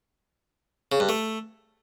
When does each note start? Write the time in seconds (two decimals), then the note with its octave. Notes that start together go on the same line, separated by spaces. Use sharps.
0.92 C#3
1.00 G2
1.09 A3